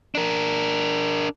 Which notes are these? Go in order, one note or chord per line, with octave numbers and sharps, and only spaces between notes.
D4 A#4